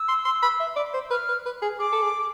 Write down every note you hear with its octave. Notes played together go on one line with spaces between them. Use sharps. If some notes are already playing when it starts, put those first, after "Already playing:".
Already playing: E6
C6
C6
B5
E5
D5
C5
B4 F6
B4
B4
G#4
G#4 D6
A4
G#4